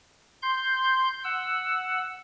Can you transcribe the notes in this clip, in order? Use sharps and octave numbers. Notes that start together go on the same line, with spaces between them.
C6 G6
F#5 E6